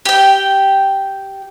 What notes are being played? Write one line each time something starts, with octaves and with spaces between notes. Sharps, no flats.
G4 G5